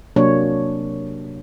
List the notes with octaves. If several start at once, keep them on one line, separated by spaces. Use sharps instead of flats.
C3 F#3 A#3 D4 C#5